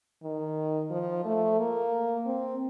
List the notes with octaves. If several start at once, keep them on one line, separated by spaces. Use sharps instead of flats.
D#3
F3
A3
A#3
C4